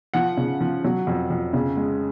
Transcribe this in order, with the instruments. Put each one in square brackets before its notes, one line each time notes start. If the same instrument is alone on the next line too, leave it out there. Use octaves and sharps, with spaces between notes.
[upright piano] F3 F#5
C#3
F3
F#3
F2
F2
C#3
G#3